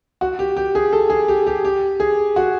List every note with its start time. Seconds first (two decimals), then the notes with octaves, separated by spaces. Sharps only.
0.21 F#4
0.39 G4
0.57 G4
0.75 G#4
0.93 A4
1.10 G#4
1.28 G4
1.47 G4
1.65 G4
2.00 G#4
2.36 F#4